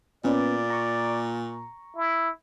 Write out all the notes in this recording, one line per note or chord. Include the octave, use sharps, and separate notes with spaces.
A#2 B3 C#4 B4 D5
A#5 C#6
E4